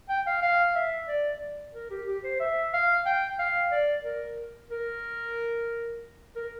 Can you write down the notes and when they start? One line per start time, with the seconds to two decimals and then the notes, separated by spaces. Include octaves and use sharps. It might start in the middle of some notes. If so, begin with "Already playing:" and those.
0.09 G5
0.27 F5
0.42 F5
0.75 E5
1.08 D5
1.74 A#4
1.90 G4
2.07 G4
2.24 C5
2.40 E5
2.73 F5
3.06 G5
3.39 F5
3.71 D5
4.04 A#4
4.70 A#4
6.36 A#4